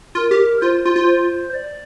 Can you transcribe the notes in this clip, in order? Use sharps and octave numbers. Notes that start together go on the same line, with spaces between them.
F4 A#4
G4
F4 C5
F4
F4
C5
D5